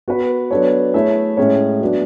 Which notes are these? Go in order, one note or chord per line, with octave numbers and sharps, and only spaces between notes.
B3 F#4 B4
F#3 B3 D4 A4 C#5
A3 E4 G#4 C#5 E5
A2 G#3 C#4 G#4 C#5
F#3 B3 D4 F#4